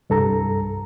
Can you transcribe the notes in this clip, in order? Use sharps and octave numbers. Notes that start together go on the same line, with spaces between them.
C2 G2 A4 A#5